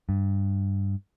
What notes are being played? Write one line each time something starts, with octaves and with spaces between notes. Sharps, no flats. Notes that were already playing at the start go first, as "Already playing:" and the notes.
G2